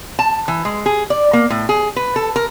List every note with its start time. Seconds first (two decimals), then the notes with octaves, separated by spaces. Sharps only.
0.19 A5
0.48 E3
0.65 G#3
0.86 G#4
1.10 D5
1.33 A#3
1.50 A2
1.69 G#4
1.96 B4
2.16 A4
2.36 A#4